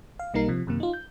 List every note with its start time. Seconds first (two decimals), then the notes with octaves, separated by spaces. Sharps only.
0.19 F5
0.34 B1 G3 A#3 D#4 A#4 C7
0.48 C3 F3
0.67 F#2 C3 D#3 A#3
0.80 D#4 F4
0.93 G6